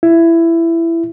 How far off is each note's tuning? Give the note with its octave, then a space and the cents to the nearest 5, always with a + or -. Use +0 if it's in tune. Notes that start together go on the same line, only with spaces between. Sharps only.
E4 +15